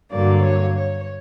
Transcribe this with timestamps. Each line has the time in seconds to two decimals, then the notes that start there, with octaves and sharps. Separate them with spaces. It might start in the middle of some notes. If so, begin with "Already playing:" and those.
0.12 G2 D3 F#3 A#3 D5
0.44 C#5
0.77 C#5